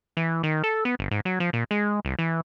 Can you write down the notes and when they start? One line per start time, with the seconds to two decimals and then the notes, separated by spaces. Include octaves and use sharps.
0.17 E3
0.43 D#3
0.64 A4
0.85 B3
0.99 G1
1.11 G#2
1.25 F#3
1.40 F3
1.53 A#2
1.71 G#3
2.05 C2
2.19 E3